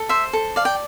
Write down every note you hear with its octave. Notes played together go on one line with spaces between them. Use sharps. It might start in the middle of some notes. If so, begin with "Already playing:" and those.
Already playing: A4
C5 E5
A4
D5 F5
G5